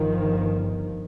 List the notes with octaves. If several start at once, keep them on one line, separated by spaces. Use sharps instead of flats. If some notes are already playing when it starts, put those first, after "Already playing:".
Already playing: G1 G2 D#3 F3